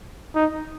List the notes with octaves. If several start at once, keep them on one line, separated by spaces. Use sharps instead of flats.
D#4